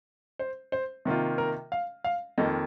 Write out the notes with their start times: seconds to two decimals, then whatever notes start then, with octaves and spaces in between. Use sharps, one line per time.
0.39 C5
0.72 C5
1.05 C3 D#3 A#3 F4
1.38 A#4
1.72 F5
2.04 F5
2.38 F2 D#3 A#3 D#5